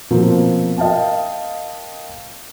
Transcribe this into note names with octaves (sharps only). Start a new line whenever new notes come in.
B2 F3 A#3 C4
A#4 D#5 F5 G5 A5